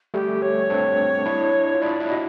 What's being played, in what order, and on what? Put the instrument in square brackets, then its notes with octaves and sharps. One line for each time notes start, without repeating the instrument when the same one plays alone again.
[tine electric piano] G3 A3 [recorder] G4
[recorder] C#5
[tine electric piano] C4 D4
D4 E4
F4
[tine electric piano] D4 E4 [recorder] D5
[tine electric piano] D4 E4
[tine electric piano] F#4 [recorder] D#5